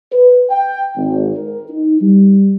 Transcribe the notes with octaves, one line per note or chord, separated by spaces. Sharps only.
B4
G5
G#1
A#4
D#4
G3